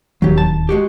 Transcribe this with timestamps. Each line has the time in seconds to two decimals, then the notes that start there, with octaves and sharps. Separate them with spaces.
0.22 D1 D#2 F#3 G4
0.38 A5
0.69 G#3 F#4 G4